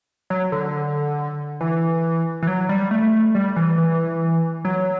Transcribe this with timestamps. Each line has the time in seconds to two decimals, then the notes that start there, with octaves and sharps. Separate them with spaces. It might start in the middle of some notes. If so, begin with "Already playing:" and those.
0.30 F#3
0.52 D3
1.61 E3
2.42 E3
2.47 F#3
2.69 G3
2.91 A3
3.35 G3
3.56 E3
3.78 E3
4.65 F#3